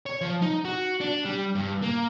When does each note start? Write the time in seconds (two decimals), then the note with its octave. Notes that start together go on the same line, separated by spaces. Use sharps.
0.06 C#5
0.21 F3
0.42 D#4
0.65 F#4
1.00 D4
1.25 G3
1.55 G2
1.82 A#3